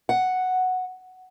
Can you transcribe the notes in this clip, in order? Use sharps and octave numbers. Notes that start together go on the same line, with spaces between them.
F#5